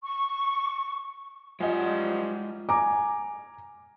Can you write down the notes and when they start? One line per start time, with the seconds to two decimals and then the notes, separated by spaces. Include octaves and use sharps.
0.03 C#6
1.60 F#2 F3 G3 G#3 F4 D#5 F#5 G#5
2.69 G#5 A#5 D6